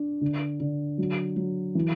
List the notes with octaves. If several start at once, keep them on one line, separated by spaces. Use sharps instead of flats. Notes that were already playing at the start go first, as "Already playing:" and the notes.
Already playing: D4
D3
D3
F#3
F#3
E3